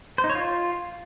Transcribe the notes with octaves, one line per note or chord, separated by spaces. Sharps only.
C5
D#4
C#5
F4